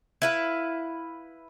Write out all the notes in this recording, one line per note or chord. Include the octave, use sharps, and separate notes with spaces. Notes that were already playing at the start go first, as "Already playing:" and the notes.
E4 B4 F5